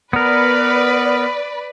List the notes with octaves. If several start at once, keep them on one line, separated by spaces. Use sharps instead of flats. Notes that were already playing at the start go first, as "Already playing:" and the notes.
B3 A#4 B4 D5